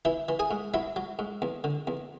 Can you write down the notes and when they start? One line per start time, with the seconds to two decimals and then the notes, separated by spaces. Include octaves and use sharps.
0.05 E3 E4 E5
0.29 E3
0.39 G#4 G#5
0.51 G#2
0.74 F#3 E4 E5
0.96 F#3
1.19 G#2
1.42 E2
1.64 D3
1.87 E2